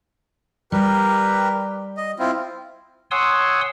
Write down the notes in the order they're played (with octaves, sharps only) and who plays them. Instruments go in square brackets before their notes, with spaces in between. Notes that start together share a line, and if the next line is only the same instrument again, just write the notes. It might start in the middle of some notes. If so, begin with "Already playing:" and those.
[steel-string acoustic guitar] G3 D5 [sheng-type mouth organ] G4 A#4 B4
[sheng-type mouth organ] D#5
C4 E4 F4
[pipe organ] C#5 F#5 G#5 C6 D#6 E6